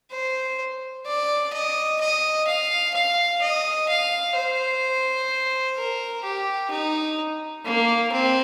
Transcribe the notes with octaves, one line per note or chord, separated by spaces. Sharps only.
C5
D5
D#5
D#5
F5
F5
D#5
F5
C5
A#4
G4
D#4
A#3
C4